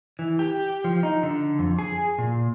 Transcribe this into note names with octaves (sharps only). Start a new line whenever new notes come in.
E3
G4
F3
D#4
D3
F2
G#4
A#2